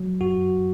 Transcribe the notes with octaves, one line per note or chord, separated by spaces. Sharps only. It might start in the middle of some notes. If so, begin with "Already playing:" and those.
Already playing: F#3
F#2 F#4